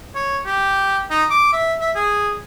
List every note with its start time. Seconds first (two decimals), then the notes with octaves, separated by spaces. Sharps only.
0.15 C#5
0.46 G4
1.10 D#4
1.30 D6
1.53 E5
1.81 E5
1.95 G#4